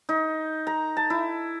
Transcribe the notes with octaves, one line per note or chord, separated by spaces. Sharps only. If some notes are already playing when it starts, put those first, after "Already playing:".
D#4
A#5
A5
E4